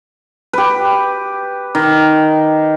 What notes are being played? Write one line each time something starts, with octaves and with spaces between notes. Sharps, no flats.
G4 B4
D#3